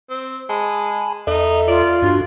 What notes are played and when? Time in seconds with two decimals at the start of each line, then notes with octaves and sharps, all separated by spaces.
0.10 C4
0.49 G#3 G#5 A5 B5
1.27 E2 D#4 A4 E5
1.68 F4 D5
2.02 G2 D4 F#4